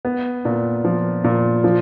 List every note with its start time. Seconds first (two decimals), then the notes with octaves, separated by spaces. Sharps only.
0.05 B3
0.45 A#2
0.85 F3
1.24 A#2
1.64 F3